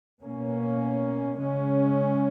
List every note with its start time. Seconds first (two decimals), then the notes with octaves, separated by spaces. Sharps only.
0.21 B2 A#3 C#4
1.40 C#3 G#3 C#4